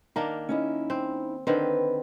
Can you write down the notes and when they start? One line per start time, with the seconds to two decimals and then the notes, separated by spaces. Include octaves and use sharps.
0.16 D#3 A#3 D4 A#5
0.49 C#4 D#4 E4
0.90 C4
1.47 D3 D#3 C4 B4